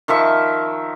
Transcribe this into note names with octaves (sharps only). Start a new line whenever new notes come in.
D#3 F3 E5 C#6